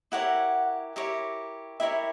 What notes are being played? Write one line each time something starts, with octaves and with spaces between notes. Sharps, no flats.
E4 G4 A#4 C#5 F#5
E4 G4 A#4 C#5
E4 G4 A#4 C#5 E5